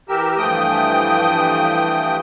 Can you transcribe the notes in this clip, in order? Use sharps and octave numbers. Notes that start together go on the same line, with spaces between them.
E3 G4 A#4 E6
G2 E3 F3 A3 G5 D#6